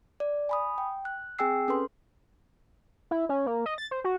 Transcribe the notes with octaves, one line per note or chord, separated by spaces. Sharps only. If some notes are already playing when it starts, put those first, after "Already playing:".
D5
G#5 B5 D#6
G5
F#6
C4 G#4 G5 G#5 E6 C7
C#4 A4 B4 C6
E4
C#4
A#3
D#5
A6
C5
F#4